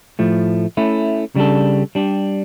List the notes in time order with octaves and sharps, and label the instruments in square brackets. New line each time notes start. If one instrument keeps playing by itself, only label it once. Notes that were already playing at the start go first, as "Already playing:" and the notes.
[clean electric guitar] A2 F3 A3
A3 C#4 E4
C#3 G3 D4 A4
G3 D4 G4